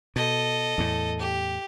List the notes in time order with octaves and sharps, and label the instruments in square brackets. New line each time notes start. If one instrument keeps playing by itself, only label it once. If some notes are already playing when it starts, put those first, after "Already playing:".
[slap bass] B2 [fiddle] A4 D#5
[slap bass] E2 A2
[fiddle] G4